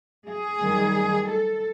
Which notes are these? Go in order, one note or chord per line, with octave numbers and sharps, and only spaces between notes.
G#4
F#2 D#3 G3
A4